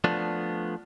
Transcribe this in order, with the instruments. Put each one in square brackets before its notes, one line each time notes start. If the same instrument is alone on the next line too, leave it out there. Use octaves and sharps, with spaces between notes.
[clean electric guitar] F3 A3 B3 D4